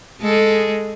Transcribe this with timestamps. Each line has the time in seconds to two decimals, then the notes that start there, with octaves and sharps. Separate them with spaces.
0.21 G#3 G#4 A4